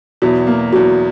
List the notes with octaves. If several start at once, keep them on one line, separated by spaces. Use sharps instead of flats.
E2 B2 F#3
A#3
E2 B2 F#3